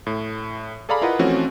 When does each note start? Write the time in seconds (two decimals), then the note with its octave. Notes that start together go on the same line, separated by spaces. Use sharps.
0.07 A2
0.89 G#4 A4 D5 F5 A#5 B5
1.02 E4 F4 A#4 B4 D#5 F#5
1.19 E3 F3 A3 C4 C#4 F#4